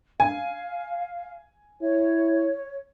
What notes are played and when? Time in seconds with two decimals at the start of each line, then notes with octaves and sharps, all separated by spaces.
0.20 F5 G#5
1.82 E4 C#5